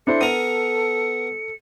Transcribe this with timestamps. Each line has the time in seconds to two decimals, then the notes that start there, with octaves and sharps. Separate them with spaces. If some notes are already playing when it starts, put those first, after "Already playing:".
0.07 D4 E4 A4 C5 C#7
0.21 B3 A#4 D#7 F7